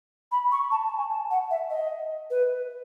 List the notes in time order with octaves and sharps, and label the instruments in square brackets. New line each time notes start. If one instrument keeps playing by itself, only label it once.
[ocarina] B5
C#6
A5
A5
G#5
A5
F#5
E5
D#5
B4